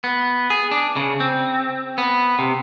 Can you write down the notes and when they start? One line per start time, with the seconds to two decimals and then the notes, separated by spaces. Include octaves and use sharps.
0.04 B3
0.50 G#4
0.71 D4
0.96 C#3
1.20 C4
1.98 B3
2.39 C3